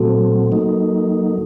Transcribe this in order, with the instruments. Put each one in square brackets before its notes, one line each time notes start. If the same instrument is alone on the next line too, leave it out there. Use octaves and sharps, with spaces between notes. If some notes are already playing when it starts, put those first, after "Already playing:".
Already playing: [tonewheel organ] A#2 F#3 A3 C4 [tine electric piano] F#4 A4
[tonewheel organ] F#3 A#3 D#4